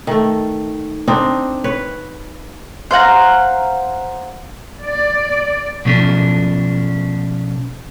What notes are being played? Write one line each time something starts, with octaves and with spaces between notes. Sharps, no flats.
D#3 A3
C4 D4 D#4
B4 C#5
C5 F5 F#5 A#5
D5
B2 F3 A3 C#4 D4